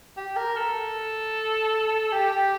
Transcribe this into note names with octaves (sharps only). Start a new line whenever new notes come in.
G4
A#4
A4
G4